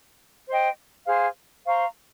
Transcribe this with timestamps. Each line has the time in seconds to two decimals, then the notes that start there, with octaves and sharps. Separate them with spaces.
0.48 C5 D#5 G5
1.07 G#4 C5 F5
1.65 C5 F5 A#5 C#6